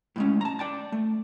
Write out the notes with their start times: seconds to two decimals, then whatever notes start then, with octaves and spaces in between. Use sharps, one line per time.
0.16 A2 G#3 C#4
0.41 A5 A#5
0.59 D5 G5 A5
0.92 A3